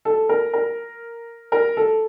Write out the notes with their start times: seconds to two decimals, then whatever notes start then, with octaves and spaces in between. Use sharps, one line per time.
0.05 A4
0.29 A#4
0.53 A#4
1.52 A#4
1.77 A4